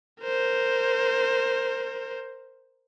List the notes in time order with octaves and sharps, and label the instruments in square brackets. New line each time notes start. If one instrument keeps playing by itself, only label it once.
[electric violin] A#4 C5